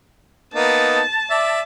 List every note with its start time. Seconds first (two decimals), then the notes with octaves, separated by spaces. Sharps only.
0.54 A#3 B3 D#4 A5
1.31 D5 E5